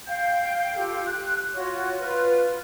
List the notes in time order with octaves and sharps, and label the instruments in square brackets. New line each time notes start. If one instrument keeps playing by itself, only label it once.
[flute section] F5 G5 G6
F4 G4 A4 G5
F#6
F4 F#4 C#5
F4 B4 F6